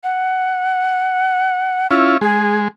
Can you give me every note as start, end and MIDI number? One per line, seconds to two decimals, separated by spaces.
0.04 1.87 78
1.91 2.18 61
1.91 2.18 64
1.91 2.18 65
1.91 2.15 88
2.21 2.68 56
2.21 2.58 68